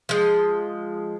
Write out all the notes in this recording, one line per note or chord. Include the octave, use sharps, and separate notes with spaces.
F3 G#3